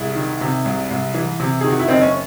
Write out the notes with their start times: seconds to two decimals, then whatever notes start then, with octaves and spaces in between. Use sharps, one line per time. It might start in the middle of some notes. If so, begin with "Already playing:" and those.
Already playing: C2 E4 G#4
0.15 D#3
0.41 C3
0.65 C2
0.91 C2
1.14 E3
1.40 C3
1.61 D#3 G#4
1.71 F#4
1.79 E4
1.88 F#1 C4 D#4
2.01 C#4